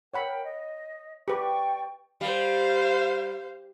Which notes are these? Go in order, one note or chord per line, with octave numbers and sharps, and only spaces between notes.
A#4 C#5 F#5 G5 B5
D#5
G4 B4 D5 G5 C#6
G3 C5 F5